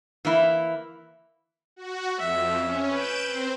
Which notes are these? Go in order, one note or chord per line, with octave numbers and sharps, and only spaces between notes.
E3 A#3 E4
F#4
F2 E5
C#4
B4 G6 D7 E7
C4 C5